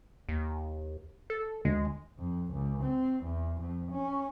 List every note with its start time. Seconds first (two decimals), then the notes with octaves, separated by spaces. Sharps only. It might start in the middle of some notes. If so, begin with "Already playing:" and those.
0.29 D#2
1.30 A4
1.65 D2 G#3
2.19 F2
2.53 C#2
2.83 C4
3.24 E2
3.60 F2
3.92 C#4